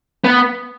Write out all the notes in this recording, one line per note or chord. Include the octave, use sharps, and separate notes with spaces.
B3